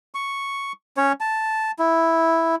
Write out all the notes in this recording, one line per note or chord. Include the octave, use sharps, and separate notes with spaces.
C#6
C#4 C#5
A5
E4